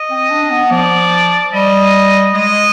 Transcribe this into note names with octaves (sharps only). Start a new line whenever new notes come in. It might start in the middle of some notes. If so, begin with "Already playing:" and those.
Already playing: D#5
C4
D4
B3
F3 D5
G3 D#5
G#3 D#5